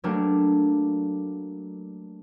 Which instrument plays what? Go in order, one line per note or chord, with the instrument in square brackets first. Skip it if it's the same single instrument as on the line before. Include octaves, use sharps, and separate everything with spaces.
[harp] F#3 G3 A3 A#3 D4